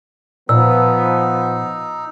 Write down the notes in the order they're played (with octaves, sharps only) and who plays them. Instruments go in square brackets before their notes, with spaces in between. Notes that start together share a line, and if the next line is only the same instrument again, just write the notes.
[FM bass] A#2 [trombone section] F3 B3 [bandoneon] D#4 [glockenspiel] E6